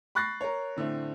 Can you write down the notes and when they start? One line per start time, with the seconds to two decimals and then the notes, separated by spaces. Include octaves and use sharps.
0.15 B5 C#6 F#6 A6 A#6 C7
0.41 A#4 C#5
0.76 A2 D3 A3 C4